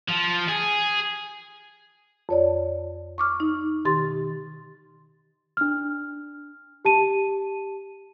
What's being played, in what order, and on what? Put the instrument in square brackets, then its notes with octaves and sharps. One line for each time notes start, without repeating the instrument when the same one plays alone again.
[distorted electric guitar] F3
G#4
[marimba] F2 C#5 D5
C#6 D6 F6
D#4
B2 D#3 G4 C6 A6
[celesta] D4 F6
G4 A5 D#7